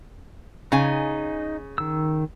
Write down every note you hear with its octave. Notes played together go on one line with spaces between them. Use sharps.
C#3 D#4 F5 G#5
D#3 E6